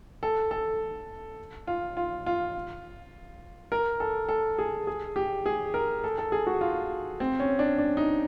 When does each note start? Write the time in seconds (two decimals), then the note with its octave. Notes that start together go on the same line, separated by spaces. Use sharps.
0.23 A4
0.51 A4
1.67 F4
1.97 F4
2.26 F4
3.72 A#4
4.00 A4
4.29 A4
4.58 G#4
4.87 G#4
5.16 G4
5.46 G#4
5.74 A#4
6.04 A4
6.18 A4
6.32 G#4
6.47 F#4
6.61 F4
7.20 C4
7.40 C#4
7.59 D4
7.78 D4
7.97 D#4